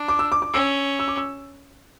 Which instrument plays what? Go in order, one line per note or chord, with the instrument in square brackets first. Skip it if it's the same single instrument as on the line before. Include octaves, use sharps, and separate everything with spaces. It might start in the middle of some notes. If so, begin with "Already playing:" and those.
Already playing: [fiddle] D4
[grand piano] D6
E6
D6
D6
[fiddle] C#4 [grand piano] E6
[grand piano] E6
D6
E6